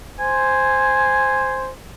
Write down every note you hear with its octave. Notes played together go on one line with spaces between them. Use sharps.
C5 G#5